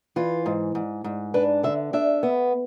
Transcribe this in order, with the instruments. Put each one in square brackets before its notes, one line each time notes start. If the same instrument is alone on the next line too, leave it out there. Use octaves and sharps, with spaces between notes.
[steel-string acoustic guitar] E3 F4
G#2
G#2
G#2
D4 B4
D3 E5
D4 E5
B3